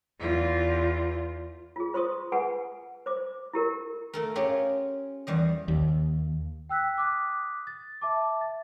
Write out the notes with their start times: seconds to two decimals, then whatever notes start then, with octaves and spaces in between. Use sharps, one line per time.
0.19 E2 F4
1.76 F4 G#4
1.93 F4 C5 C6 C#6 D#6
2.32 G#4 B4 F#5 G#5
3.06 C5 D6
3.53 E4 G4 A#4
4.13 A3 A4 A#4
4.35 C#4 F4 G4 G#4 A#4
5.27 E2 G3 D#5
5.68 D#2
6.69 G5 E6 F#6 B6
6.98 D6 D#6 F#6 B6
7.67 A6
8.01 E5 A5 D6
8.41 A6